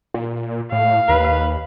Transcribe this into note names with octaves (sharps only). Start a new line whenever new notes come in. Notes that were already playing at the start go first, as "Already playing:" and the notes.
A#2
A2 F5
D#2 B4